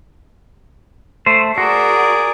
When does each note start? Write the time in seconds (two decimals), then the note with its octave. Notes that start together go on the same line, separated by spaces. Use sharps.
1.26 A3 C5
1.58 F#4 G#4 A#4 D5